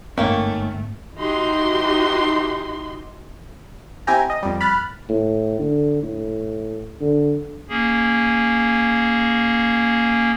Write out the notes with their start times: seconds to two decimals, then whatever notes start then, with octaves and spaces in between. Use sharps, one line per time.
0.18 G1 G#2 D#3 A3 A#3 C4 C#4
1.18 E3 D#4 F#4 G4 C6
4.07 C4 E4 G4 G5 G#5 A#5
4.30 D#5
4.43 F2 G3
4.61 B5 F6 F#6 A6
5.09 A2
5.59 D3
6.02 A2
7.01 D3
7.69 A#3 C#4 G#4